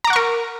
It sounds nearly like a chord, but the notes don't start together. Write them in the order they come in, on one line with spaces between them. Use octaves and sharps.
A#5 D6 F#5 C#6 A#4